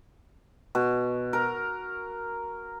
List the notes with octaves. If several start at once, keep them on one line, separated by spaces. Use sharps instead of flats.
B2
A#4